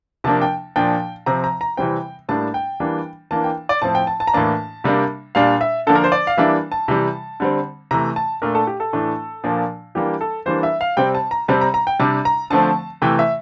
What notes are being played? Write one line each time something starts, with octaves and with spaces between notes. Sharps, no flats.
C3 F3 A#3 D4 A5
G5
A#2 F3 A#3 D4 G5
C3 F3 C4 A#5
A#5
A#5
C3 E3 G3 C4 G5
A2 G3 A#3 D4 A5
G5
E3 G3 A#3 D4
E3 A#3 D4 A5
G5
D5
A2 F3 C4 A5
G5
A5
A5
A#5
A2 E3 A#3 D4 A5
C3 G3 A#3 D4
A#2 G3 D4 F5
E5
D3 F3 A#3 D4 A4
A#4
C5
D5
F5
E3 G3 A#3 D4 E5
A5
C3 E3 G3
D3 G3 C4
C3 E3 A3 A#5
A5
A#2 A3 D4 A#4
A4
G4
A4
A2 E3 A3 D4
A#2 F3 A#3 D4
E3 G3 A#3 D4 G4
A4
E3 G3 A#3 D4 C5
E5
F5
C3 G3 C4 G5
A5
A#5
C3 G3 C4 A5
A#5
A#5
G5
C3 G3 D4 A5
A#5
D3 F3 A3 C4 A5
C3 E3 A3 G5
E5